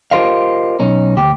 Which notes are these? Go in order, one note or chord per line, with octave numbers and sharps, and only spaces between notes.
F4 G4 A#4 C5 D#5 F5
B1 C#4 D#4
D2 G4